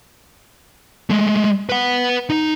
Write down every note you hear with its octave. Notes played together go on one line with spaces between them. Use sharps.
G#3 A3
B4 F#5
D#4